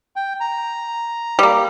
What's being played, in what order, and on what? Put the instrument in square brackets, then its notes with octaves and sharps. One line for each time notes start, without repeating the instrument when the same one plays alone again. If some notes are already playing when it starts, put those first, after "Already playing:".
[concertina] G5
A#5
[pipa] G3 A#3